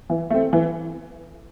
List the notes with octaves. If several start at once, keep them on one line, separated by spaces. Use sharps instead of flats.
E3
A3 C4
E3